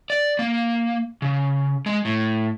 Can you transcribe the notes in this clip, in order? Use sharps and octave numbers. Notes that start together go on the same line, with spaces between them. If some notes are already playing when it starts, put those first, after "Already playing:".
D5
A#3
C#3
G#3
A2